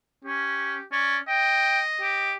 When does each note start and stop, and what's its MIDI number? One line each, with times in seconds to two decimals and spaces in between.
0.24 0.76 61
0.24 0.86 67
0.92 1.17 61
0.92 1.20 74
1.28 2.35 75
1.28 1.79 79
2.01 2.34 67